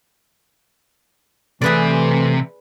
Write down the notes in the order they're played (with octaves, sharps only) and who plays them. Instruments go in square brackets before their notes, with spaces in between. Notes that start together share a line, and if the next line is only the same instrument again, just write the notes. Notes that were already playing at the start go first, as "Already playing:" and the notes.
[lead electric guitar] C3 E5 [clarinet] E3 [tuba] A3 [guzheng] G#4 B4 D5